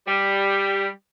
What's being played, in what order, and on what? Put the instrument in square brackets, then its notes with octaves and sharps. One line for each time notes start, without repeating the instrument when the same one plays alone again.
[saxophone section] G3